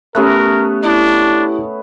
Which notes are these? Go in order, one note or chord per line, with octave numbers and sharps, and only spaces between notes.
A3 B3 C#4 G4 A#4 F#6
D4 E4